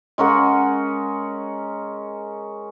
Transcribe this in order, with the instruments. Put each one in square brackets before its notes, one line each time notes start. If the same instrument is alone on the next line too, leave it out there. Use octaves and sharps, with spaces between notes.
[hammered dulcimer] G#3 C#4 A#4 F#5